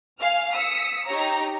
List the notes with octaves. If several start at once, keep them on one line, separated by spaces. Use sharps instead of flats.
F5 G#5 F6
D#6 E6 B6 C#7
D#4 G4 C#5 A#5